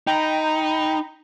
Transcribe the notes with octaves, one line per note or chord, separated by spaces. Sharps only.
D#4 G5 A#5 B5